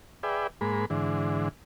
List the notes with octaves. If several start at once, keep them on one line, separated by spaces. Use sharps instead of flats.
G#4 B4 D5 E5 G5
G#2 G#3 A#3 B5
G#2 D3 E3